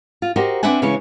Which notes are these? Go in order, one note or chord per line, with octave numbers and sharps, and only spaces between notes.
F4
F#4 G4 A#4 C5 D#5
C4 D4 B4 E5 F#5 G#5
C#3 E3 G#3 C#4 C#5